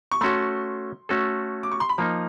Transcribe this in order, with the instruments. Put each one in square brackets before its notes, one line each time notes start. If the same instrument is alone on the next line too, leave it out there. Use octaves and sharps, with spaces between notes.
[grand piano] C#6
[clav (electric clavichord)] A3 C#4 F#4 A4 [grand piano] C6
[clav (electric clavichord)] A3 C#4 F#4 A4
[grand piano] D6
C#6
C6
B5
[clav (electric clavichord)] F3 A#3 D#4 [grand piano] A#5